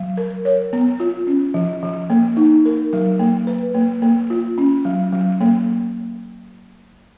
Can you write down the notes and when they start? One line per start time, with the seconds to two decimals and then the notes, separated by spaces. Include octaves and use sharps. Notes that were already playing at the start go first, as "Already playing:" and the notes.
Already playing: F#3
0.17 A#4
0.45 C#5
0.73 B3
1.00 F4
1.27 C#4
1.54 F3
1.83 F3
2.10 A#3
2.37 D#4
2.65 A#4
2.93 F#3
3.19 A#3
3.47 B4
3.75 A#3
4.02 A#3
4.30 F4
4.58 C#4
4.85 F#3
5.12 F#3
5.41 A#3